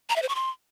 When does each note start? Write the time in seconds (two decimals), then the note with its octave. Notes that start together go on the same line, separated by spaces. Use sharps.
0.10 A#5
0.16 E5
0.22 C5
0.29 C#6
0.35 C6